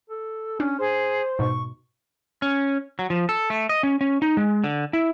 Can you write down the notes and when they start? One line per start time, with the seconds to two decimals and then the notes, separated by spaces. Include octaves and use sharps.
0.10 A4
0.60 C#4 D4
0.79 G#4 C5
1.39 G#2 B2 C#6
2.42 C#4
2.99 F#3
3.10 F3
3.29 A4
3.50 A3
3.69 D#5
3.83 C#4
4.01 C#4
4.22 D#4
4.37 G#3
4.64 D3
4.93 E4